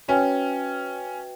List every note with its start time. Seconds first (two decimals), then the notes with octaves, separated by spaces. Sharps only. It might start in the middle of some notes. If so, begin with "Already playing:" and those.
0.08 C#4 F#4 B4 E5 G5